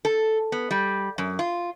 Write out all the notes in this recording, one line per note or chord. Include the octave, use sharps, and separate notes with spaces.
A4
B3
G3
F#2
F4